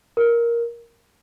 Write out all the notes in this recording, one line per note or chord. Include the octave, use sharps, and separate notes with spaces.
A#4